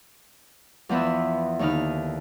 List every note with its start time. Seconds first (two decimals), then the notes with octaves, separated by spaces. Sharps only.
0.89 E2 F3 B3 E5 E6
1.59 D#2 D3 D#4 E4 F6